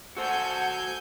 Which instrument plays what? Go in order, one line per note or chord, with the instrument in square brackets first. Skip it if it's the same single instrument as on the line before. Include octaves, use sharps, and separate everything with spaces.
[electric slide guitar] F#4 C5 [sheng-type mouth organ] A4 E6 [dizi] F#5 [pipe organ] G#5 G6